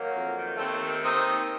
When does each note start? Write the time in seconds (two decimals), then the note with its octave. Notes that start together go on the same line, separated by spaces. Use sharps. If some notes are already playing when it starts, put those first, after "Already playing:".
Already playing: D#3 F#3 A#3
0.13 F2
0.36 D#3
0.57 D#2 A3 C4
0.80 D#3
1.02 D#2 C4 D#4
1.25 D#3